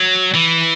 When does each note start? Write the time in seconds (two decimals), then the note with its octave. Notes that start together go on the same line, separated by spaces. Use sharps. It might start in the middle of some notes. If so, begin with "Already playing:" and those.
Already playing: F#3
0.34 E3